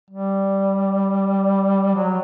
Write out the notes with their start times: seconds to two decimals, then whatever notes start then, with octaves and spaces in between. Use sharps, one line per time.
0.10 G3
1.95 F#3